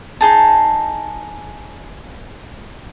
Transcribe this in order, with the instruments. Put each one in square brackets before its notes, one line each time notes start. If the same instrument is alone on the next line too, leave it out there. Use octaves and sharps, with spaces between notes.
[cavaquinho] D#4 G#4 A5